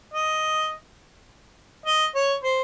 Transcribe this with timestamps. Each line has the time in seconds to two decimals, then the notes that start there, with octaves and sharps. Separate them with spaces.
0.14 D#5
1.86 D#5
2.15 C#5
2.44 C5